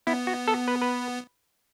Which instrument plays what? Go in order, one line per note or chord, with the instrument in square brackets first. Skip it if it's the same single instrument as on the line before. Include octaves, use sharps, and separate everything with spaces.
[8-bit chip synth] B3 [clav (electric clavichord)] E4
[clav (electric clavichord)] F#4
A4
B4
B4